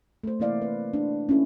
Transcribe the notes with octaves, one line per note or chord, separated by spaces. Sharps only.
A3 C5
C3 E3 A#3 E4 D5 F5
B4
D4
C#4 E4 A4